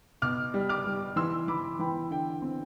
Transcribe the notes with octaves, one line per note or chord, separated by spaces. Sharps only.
B2 D6 F6
G3
D6 F6
G3
E3 C6 E6
E3 B5 D6
E3 G5 B5
D3 G5
C4